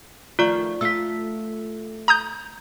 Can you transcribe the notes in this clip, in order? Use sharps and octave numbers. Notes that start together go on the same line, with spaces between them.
D#3 F3 A3 F4 D5 C#6
A3 F4 E6 B6
A#5 D#6 G6